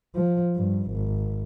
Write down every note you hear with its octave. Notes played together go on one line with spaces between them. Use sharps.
F3
G2
G#1